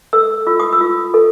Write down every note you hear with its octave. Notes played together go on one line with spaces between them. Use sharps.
A4 E6
F4 E6
D#6
E6
F4
A4